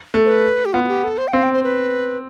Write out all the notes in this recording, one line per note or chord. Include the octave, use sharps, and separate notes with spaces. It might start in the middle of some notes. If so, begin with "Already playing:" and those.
A3
C5
B4
G4
B3 F4
F4
G4
A4
C5
G5
C4 F5
G5
C5
B4